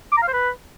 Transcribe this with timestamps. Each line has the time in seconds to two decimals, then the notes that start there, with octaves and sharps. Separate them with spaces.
0.12 D6
0.17 A#5
0.22 F5
0.28 C5
0.33 B4